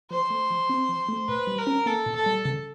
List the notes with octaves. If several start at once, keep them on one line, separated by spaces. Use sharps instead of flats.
F3 C5
A3
F3
C4
F3
A3
A#2 B4
G3
A#4
C#4
A#3 A4
A#2
A4
G3
C#3